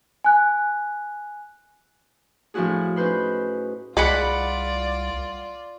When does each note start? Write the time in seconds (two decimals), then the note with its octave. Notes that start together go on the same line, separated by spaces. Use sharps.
0.24 G#5 F#6
2.54 A2 F3 D4 E4 F#4 G#4
2.96 C#4 D#4 B4 C5 B5
3.97 C2 G#3 F4 D5 F#5 B5 D6